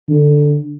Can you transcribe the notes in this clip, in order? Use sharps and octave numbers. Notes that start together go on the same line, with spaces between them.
D3